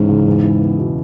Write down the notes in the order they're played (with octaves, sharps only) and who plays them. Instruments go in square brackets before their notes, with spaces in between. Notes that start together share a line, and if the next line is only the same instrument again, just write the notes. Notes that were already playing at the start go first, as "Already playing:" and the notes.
Already playing: [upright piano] C#2 E3 C#4 [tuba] G#2
[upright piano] C#3
E2
E4
B3
B2